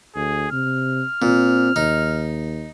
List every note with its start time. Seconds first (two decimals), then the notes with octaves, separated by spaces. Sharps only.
0.16 D2 G#4
0.52 C3 F6
1.22 A#2 C4
1.76 D#2 D#4